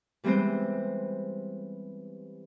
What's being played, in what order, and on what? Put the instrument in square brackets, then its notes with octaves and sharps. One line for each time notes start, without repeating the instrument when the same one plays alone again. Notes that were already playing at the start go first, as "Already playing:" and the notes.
[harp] E3 G3 G#3 B3 C4 C5